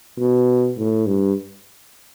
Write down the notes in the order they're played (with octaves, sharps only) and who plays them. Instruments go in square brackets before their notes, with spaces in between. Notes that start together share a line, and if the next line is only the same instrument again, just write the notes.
[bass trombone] B2
A2
G2